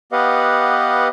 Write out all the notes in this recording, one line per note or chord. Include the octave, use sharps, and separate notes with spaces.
B3 G4 B4 D#5 F5 F#5